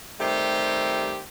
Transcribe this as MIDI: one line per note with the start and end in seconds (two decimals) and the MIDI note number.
0.19 1.19 51
0.19 1.19 55
0.19 1.19 57
0.19 1.19 60
0.19 1.19 67